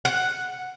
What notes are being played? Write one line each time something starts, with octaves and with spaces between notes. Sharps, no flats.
F#5